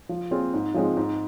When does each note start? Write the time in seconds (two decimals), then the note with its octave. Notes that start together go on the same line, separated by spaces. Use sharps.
0.09 F3
0.31 C4 F4 G#4
0.54 G#2
0.74 F3 G#3 C4
0.97 G#2